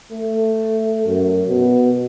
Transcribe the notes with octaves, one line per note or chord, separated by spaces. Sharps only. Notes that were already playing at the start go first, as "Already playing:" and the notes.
A3
F#2
B2